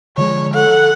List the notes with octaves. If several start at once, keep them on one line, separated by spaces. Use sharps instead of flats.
D3 F3 G#3 C#5
A4 F#5